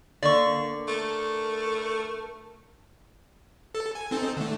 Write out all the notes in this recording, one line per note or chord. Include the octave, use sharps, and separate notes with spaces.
D3 A#3 D5 C#6
A3 A#4
A4
G#5
C4 D#4 A4
D3 A3